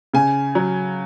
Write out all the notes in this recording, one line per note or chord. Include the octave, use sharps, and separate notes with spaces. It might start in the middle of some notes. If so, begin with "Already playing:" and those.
C#3 G#5
F#3